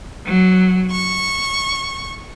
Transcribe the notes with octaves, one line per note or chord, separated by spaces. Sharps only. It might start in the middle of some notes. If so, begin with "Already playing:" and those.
F#3
C#6